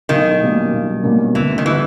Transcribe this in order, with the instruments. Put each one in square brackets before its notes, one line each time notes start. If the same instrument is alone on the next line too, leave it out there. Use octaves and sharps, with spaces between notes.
[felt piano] B1 [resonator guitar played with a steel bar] D#3
[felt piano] B2 G3 A#3 C#4
B1
B2 G3 A#3 C#4
[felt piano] D2 [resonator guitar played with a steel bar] E3
[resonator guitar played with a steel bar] D#3
[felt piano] D3 G3 B3 [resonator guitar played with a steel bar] E3